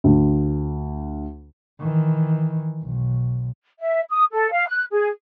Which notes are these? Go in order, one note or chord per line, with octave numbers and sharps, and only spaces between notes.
D2
D#3 E3
B1
E5
D#6
A4
F5
F#6
G#4